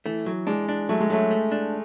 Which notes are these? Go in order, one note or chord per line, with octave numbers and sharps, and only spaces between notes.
E3 A3
F#3
G#3 D4
D4
F#3 A3
G#3
F#3 A3
A3
D4